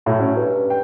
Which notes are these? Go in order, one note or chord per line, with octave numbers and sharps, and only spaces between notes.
A2 F#3
C#4
G2
G5